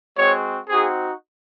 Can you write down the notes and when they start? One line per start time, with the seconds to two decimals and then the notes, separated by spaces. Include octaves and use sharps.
0.17 G#3 C4 F#4 C#5
0.69 C4 D#4 F#4 G#4